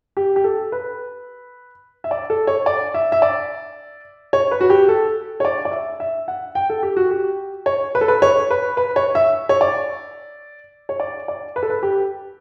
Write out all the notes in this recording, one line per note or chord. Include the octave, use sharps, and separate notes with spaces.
G4
G4
A4
B4
E5
D5
A4
C#5
D5
E5
E5
D5
C#5
B4
F#4
G4
A4
C#5
D5
D5
E5
E5
F#5
G5
A4
G4
F#4
G4
C#5
B4
A4
B4
C#5
B4
B4
C#5
E5
C#5
D5
C#5
D5
D5
B4
A4
B4
G4